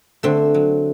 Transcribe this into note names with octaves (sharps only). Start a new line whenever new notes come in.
D3 A3 C4
F#3